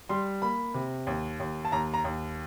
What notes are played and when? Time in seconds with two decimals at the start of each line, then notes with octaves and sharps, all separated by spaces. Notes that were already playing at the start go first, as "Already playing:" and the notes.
0.09 G3 C6
0.42 A#3 B5
0.74 C3
1.07 D#2
1.40 D#2
1.65 A5
1.72 D#2 A#5
1.94 A#5
2.04 D#2